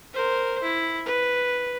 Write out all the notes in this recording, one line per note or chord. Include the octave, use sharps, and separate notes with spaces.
A#4 C5
E4
B4